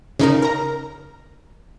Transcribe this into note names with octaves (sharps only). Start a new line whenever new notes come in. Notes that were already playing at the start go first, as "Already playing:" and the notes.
C#3 D#4 A#4
A#4 A#5